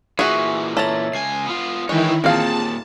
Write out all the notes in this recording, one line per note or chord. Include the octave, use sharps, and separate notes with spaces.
A#2 E3 F#4 G#4 E5 C#6
A4 C#5 E5 A#5 A6
C#2 G#5 C7
B3 F4
D#3 E3 G#3 E4 C#5 G5
D#2 A#2 A#3 C4 F4 G#4 F5 A5